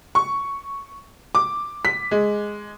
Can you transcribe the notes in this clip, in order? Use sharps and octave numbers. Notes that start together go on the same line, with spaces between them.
C#6
D6
B6
G#3